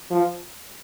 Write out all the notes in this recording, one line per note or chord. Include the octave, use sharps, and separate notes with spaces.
F3